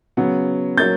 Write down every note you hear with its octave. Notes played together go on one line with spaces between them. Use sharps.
C#3 F#3 B3
F#3 A#3 C#4 G6 A6